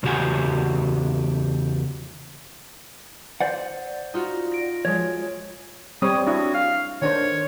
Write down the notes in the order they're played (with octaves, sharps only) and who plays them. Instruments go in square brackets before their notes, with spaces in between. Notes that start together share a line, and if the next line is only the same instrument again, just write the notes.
[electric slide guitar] E2 C#3 F#4 G4 F#5 G#5
[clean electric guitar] C5 D5 F#5
[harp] D#4 F4 F#4
A#6 D7
[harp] F3 G#3 [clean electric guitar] C#5
[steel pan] G3 C4 C#5 [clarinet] D#6
[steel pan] D4 E4 [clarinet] F#4
[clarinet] F5
[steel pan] D#3 D4 C5 [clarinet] C#5